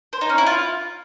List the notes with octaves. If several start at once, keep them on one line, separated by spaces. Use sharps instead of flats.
C5
D#4
C#4
E4
F4